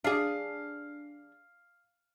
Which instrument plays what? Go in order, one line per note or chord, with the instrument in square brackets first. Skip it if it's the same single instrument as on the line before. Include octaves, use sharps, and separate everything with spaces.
[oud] D4 G#4 [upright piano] F5